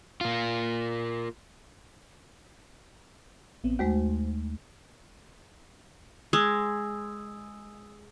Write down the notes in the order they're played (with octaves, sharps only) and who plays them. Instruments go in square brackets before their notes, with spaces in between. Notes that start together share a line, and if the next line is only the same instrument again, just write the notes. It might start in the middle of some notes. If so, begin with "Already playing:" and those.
[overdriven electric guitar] A#3 F4
[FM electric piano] A1 B3 C4
[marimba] D#2 G#3 A3 [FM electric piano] F#4 C5
[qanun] G#3 [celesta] D#6 E6